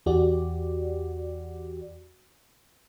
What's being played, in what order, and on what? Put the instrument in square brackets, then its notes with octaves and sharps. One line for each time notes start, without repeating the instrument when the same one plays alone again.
[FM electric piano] E2 F#4 G4 D5